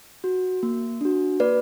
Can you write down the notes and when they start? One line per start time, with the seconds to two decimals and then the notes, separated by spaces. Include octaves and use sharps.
0.24 F#4
0.63 A#3
1.01 D4 F#4
1.40 A#3 B4 D5